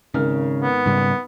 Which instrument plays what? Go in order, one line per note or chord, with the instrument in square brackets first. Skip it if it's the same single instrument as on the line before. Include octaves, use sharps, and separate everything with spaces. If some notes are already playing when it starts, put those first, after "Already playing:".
[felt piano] G#1 A#4 F6 [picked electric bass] C#3
[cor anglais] B3
[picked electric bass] G#2 C#3 G3